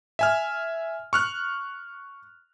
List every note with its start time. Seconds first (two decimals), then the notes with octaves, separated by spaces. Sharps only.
0.19 E5 G#5 F6
1.13 C#6 F6 F#6